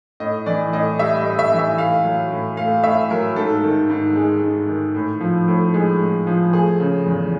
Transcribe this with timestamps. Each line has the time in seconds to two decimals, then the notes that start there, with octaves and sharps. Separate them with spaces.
0.20 A2 D#5
0.46 E3 D5
0.73 A2 D#5
0.99 G3 E5
1.19 D#5
1.26 A2
1.39 E5
1.52 E3
1.59 E5
1.78 A2 F5
2.04 F#3
2.31 A2
2.57 A3 F5
2.84 A2 E5
3.10 F#3 A#4
3.36 G#2 A4
3.63 D#3
3.90 G#2
4.16 G#3
4.42 G#2
4.68 D#3
4.95 A2
5.21 F3
5.48 A2
5.74 G#3
6.00 A2
6.27 F3
6.53 A3 G#4
6.80 C#3
7.06 E2